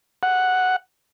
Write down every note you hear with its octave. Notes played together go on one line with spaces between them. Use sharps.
F#5